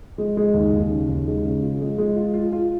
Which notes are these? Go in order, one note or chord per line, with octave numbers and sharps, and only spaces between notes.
G#3
G#3
D#2
D#2
C#3
D#2
G#3
C#3
F4
G#3
G#3
F4
F4
F4